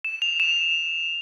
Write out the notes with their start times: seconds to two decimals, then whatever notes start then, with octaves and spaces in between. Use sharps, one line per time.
0.05 E7
0.22 F7
0.40 E7